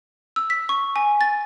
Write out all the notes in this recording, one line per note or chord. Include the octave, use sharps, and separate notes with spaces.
E6
B6
C#6
G#5
A6